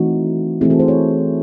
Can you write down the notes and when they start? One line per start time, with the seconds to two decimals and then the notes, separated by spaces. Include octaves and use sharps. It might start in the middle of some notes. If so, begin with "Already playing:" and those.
Already playing: E3 A3 C4 D#4 F#4
0.61 E3 A3 C4 E4 G#4
0.70 F#4 A4
0.79 G#4 C5
0.88 A4 C#5